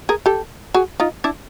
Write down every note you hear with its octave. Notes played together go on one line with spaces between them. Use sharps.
G#4 A#4
G4 A4
F#4 G#4
D#4 F4
D4 E4